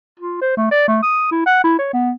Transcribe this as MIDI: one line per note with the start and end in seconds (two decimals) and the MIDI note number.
0.20 0.38 65
0.42 0.54 72
0.57 0.69 57
0.71 0.87 74
0.88 1.01 57
1.03 1.28 87
1.32 1.41 64
1.46 1.61 78
1.64 1.76 64
1.79 1.91 73
1.94 2.11 59